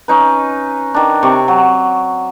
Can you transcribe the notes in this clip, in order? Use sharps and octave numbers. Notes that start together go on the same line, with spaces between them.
C#4 D#4 B4
D#3 D4
C3 C#6 D6
F#3